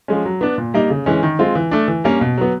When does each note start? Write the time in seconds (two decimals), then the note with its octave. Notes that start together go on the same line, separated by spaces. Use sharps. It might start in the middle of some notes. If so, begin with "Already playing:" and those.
0.08 F3 G#3 C#4
0.25 F#3
0.41 B3 D4
0.58 A#2
0.74 G3 A#3 D#4
0.90 C#3
1.06 E3 G#3 C#4
1.23 D#3
1.39 G#3 C4 F4
1.55 E3
1.71 A3 D4
1.88 E3
2.04 G3 A#3 C#4
2.21 B2
2.38 F#3 B3